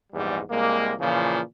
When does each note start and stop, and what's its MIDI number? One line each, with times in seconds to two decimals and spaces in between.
0.13 0.40 34
0.13 0.40 40
0.13 0.40 44
0.13 0.40 55
0.50 0.92 36
0.50 0.92 56
0.50 0.92 58
0.99 1.40 46
0.99 1.40 49
0.99 1.40 52
0.99 1.40 53